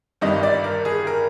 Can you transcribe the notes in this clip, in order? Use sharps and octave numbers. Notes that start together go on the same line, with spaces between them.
G1 G2 D#3 G3 D#5
D5
A#4
G#4
A#4